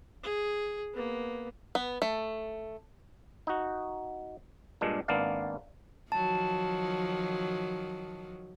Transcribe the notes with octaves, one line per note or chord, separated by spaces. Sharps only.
G#4
A#3 B3
B3
A3
D#4 F#4
G2 A#2 G#3 D4
G#1 A#3 B3 D4 D5 F5
D#3 F3 F#3 A5